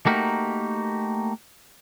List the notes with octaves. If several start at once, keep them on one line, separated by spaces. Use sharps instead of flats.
A3 A#3 D#4 F#4 G4 A#4